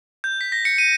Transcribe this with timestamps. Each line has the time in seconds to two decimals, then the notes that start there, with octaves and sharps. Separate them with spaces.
0.24 G6
0.41 B6
0.52 A#6
0.65 C#7
0.78 D#7